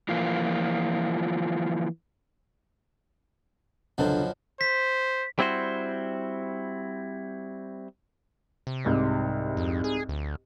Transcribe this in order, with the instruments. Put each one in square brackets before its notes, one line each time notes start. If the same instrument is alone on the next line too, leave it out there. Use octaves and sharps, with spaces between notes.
[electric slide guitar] E3 F3 A#3 F4
[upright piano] C#2 D3 [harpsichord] F#2 B2 F3
[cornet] C5 [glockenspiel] B6
[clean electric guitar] G3 C4 E4 F#4 C5
[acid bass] C3
[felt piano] C2 G#2
[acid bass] F2
G#4
D2